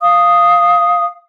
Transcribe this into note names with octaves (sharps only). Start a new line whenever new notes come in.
F5 D#6